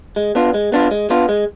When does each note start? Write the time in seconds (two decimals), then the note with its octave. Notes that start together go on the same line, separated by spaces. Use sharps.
0.16 G#3
0.35 B3 D4 F4
0.54 G#3
0.72 B3 D4 F4
0.91 G#3
1.10 B3 D4 F4
1.29 G#3